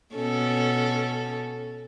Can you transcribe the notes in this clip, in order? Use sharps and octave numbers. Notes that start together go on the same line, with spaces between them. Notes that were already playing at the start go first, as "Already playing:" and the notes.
B2 C#4 A4